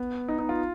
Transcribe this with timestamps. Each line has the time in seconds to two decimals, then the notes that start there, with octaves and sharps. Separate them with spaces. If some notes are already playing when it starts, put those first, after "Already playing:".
Already playing: B3
0.28 D#4
0.39 D#4
0.49 F4